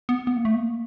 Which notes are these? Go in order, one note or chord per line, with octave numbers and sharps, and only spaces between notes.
B3
B3
A#3
A3
A#3